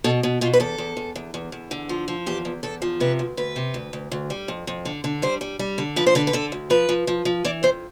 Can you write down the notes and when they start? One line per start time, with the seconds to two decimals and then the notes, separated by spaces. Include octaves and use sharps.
0.04 B2 A4
0.23 B2
0.41 B2 F4
0.53 B4
0.60 E2 A4
0.78 E2
0.97 E2
1.15 E2
1.34 E2
1.52 E2
1.71 D3
1.89 F3
2.08 F3
2.26 E2 G4
2.45 E2
2.63 E2 A4
2.82 F3
3.00 C3 B4
3.19 D2
3.37 D2 B4
3.56 C3
3.74 D2
3.93 D2
4.12 D2
4.30 G3
4.48 F2
4.67 F2
4.85 D3
5.04 D3
5.22 G3 C5
5.41 G3
5.59 G3
5.78 D3
5.96 F3 B4
6.06 C5
6.15 D3 B4
6.27 B4
6.33 D3 A4
6.52 D2
6.70 F3 B4
6.89 F3
7.07 F3
7.25 F3
7.45 E3 D5
7.63 F2 C5